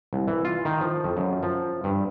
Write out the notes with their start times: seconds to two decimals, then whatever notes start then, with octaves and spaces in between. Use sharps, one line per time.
0.13 C2
0.28 E3
0.45 F4
0.65 D#3
0.81 F3
1.04 F2
1.17 F#2
1.43 F3
1.84 G2